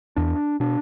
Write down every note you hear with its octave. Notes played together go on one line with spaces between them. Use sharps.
E2 D4
B2 D4